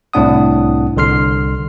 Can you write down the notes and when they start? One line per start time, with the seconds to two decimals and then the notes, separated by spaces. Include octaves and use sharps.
0.14 C2 A2 C4 D4 F#5 D#6
0.97 C2 D3 C6 F6 C7